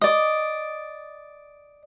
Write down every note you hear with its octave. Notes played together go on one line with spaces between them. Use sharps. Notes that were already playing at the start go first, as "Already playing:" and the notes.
D5 D#5